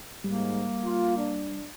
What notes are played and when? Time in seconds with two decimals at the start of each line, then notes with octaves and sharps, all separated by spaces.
0.24 G#2 G3 A#3
0.84 F4
1.17 D4